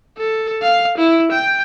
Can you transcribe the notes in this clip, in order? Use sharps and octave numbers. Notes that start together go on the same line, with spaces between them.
A4
F5
E4
G5